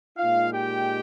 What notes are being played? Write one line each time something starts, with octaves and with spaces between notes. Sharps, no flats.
A#2 G#3 D#4 F4 F5
G4 G5